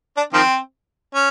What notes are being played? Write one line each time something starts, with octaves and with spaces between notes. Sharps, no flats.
D4
D#3 F3 C4
C#4